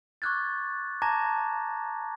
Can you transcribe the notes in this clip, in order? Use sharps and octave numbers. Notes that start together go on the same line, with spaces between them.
C#6 D6 F6 F#6 G#6 A6
A5 A#5 D6 G#6 A#6